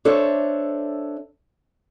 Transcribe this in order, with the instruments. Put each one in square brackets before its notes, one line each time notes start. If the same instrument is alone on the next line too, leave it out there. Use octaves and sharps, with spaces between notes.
[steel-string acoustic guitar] D4 A4 C5 C#5 E5